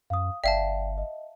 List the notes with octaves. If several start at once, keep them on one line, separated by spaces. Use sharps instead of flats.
F#2 F5 D#6
G1 D5 E5 F5 G5 A5
D#5